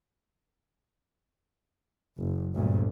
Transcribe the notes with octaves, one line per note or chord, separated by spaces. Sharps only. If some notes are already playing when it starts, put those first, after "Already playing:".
F#1
G1 D2 A#2